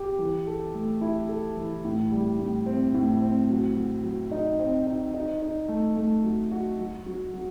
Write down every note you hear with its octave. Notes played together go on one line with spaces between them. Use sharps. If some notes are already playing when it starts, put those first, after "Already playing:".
Already playing: G4
E3
A4
A3
E4
A4
E3
A2
G3
A2
C4
A2
C4
F#3
F#3
F#3
D#4
C4
D#4
D#4
D#4
A3
A3
F#3
F#4
F#3
F#3
F#3